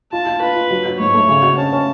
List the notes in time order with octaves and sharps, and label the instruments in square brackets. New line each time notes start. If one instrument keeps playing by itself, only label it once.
[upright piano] F4 [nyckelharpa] A5
[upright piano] F4
[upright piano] F4 [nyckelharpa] B4
[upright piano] F4
F#3
F#3
[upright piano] G#2 [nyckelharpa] C#5
[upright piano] A3
C#3
F#4
[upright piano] C#4 [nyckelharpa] A5
[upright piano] C#4